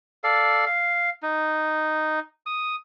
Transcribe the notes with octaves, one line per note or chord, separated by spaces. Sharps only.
A4 D5 F5
F5
D#4
D#6